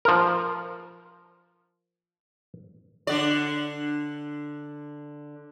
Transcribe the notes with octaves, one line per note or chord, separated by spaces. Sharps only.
F3 A#4
D3 D5